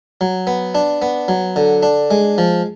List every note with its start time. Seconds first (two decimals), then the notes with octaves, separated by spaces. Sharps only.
0.21 F#3
0.47 B3
0.75 D4
1.02 B3
1.28 F#3
1.56 D3
1.83 D4
2.11 G#3
2.38 F3